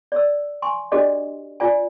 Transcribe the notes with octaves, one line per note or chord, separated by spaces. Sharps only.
D5 E6
G#5 C6 C#6
D4 F#4 G4 A4 D5 D#5
F4 D5 G#5